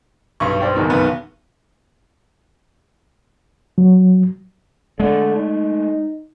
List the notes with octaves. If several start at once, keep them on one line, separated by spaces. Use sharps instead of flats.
B1 G2 C#6
C5 D5 G5
F#1 E2 D#3
B1 B3
F#3
D3 G#3 A3
D#4